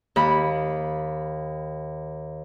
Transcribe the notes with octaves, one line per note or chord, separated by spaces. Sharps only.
D#2 B5